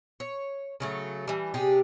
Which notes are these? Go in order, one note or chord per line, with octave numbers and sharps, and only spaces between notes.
C#5
C#3 F#3 A3
E3 G3
C3 D4 G4 G#4